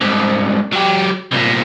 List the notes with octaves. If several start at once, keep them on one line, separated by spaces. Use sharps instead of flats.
C2 G#2
F#3 G4
C2 A#2